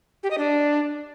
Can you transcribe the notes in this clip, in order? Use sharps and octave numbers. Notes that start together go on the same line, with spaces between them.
G4
D#5
D4